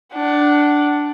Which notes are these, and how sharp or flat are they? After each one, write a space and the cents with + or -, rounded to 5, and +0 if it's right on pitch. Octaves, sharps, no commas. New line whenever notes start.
D4 +0 F#5 +30